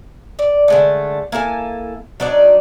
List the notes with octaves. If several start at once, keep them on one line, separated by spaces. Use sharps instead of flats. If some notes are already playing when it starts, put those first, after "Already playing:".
D5
D3 G#3 A3
A#3 E4 A4 G#5
F#3 D4 D#4 D5